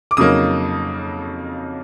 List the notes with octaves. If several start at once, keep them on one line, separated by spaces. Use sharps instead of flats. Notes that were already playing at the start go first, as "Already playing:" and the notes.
D6
F2 C#3 F#3 A#3 D#4 D#6